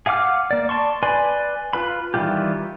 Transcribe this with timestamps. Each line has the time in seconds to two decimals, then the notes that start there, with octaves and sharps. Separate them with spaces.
0.06 G#4 F5 F#5 D6 F6
0.51 A#3 D5
0.69 D5 A5 C6 C#6
1.03 B4 D5 G#5 B5 C6
1.73 F4 B4 B5
2.14 D#3 E3 G3 F4 G4